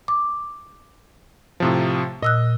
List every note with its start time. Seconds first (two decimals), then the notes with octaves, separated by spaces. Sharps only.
0.08 D6
1.60 A2 C3 F3
2.23 A#2 D#5 E6 F#6